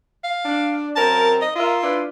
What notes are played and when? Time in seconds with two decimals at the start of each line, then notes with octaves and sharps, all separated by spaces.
0.24 F5
0.45 D4
0.96 F#2 C4 A#4 A5
1.42 D#5
1.56 F4 A#4 D#5 E5
1.82 D4 E4 B4